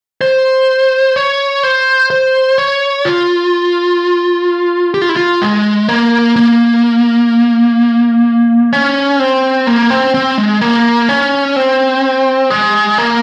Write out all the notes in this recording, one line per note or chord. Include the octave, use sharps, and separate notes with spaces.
C5
C#5
C5
C5
C#5
F4
G4
F4
E4
F4
G#3
A#3
A#3
C#4
C4
A#3
C4
C4
G#3
A#3
C#4
C4
G#3
A#3